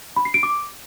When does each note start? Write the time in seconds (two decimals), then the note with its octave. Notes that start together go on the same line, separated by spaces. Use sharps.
0.16 B5
0.25 C7
0.34 D7
0.43 D6